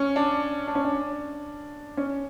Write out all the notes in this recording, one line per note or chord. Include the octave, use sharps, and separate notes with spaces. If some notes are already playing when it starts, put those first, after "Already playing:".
Already playing: C#4
D4
D4
C#4
D4
C#4